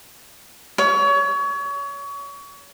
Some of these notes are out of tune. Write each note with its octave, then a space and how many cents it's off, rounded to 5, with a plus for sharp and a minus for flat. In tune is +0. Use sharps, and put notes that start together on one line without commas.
C#5 +30